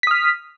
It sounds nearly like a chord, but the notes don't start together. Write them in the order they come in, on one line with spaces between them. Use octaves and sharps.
B6 D#6 F6